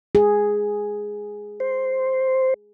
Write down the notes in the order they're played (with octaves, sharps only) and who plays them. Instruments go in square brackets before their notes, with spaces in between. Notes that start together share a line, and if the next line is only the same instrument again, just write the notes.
[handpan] G#4
[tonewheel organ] C5